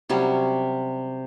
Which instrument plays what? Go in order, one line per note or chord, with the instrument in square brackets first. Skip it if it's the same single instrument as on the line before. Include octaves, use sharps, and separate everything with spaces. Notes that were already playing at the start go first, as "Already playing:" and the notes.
[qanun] C3 F#3 G3 C#4